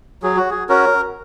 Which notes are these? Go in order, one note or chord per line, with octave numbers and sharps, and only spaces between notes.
F#3 G#4
F#4
G#4
C#4 F#4 A#4